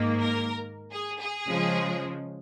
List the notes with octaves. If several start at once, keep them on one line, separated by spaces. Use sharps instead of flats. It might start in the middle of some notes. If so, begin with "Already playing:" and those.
Already playing: G#2 D#3 A#3
A#4
G#4
G#4
C#3 F3 G#3